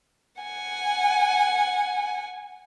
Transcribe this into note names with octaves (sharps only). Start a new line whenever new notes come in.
F#5 G#5